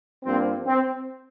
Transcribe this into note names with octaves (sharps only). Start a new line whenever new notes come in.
G2 F3 A#3 C4
C4